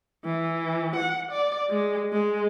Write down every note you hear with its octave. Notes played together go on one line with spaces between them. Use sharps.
E3
F#5
D5
G#3
G#3